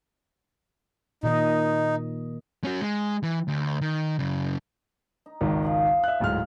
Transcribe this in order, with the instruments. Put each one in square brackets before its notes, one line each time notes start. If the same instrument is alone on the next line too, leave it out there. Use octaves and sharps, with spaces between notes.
[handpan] A#2 D#3 D#5 [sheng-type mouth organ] D#4
[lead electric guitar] C#4 F#4
G#3
E3
D2
D#3
F#2 C#3
[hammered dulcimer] D#4
[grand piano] G#1 C#2 D#3
[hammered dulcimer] F3 G#4 F5
[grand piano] E5 F#6
D1 G#2 F6